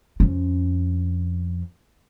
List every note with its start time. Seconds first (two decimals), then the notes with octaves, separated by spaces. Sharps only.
0.20 F2 C#4